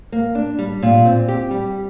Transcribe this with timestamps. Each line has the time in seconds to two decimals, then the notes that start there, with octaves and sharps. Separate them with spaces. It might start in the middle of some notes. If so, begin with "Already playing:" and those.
0.12 A#3
0.35 D4
0.59 G3
0.82 A#2
1.05 C4
1.28 G4
1.51 G3